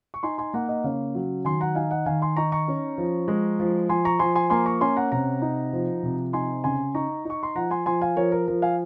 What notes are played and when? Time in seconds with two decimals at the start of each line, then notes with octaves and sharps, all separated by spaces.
0.14 C#6
0.23 D#4 G#5 C6
0.38 G#5 C6
0.54 A#3 F#5 A#5
0.69 D#5 F#5
0.84 C#3 C#5 F5
1.15 F#3
1.45 D#3 G#5 C6
1.60 F#5 A#5
1.75 D#4 F5 G#5
1.91 D#5 F#5
2.06 D#3 F5 G#5
2.21 G#5 C6
2.36 D#4 A#5 C#6
2.52 A#5 C#6
2.68 C#4
2.98 F3
3.28 G#3
3.60 F3
3.89 F3 G#5 C6
4.05 A#5 C#6
4.19 F3 G#5 C6
4.35 G#5 C6
4.50 A#3 G#5 C6
4.66 A#5 C#6
4.81 C#4 G#5 C6
4.96 F#5 A#5
5.12 C3 F#5 A#5
5.42 D#4
5.73 F3
6.03 C3
6.33 D#4 G#5 C6
6.64 C#3 G#5 C6
6.94 D#4 A#5 C#6
7.25 D#4 C#6
7.43 C6
7.55 F3 F#5 A#5
7.71 G#5 C6
7.86 F3 G#5 C6
8.01 F5 G#5
8.17 F3 A#4 C#5
8.32 A#4
8.48 F3 A#4
8.62 F5 G#5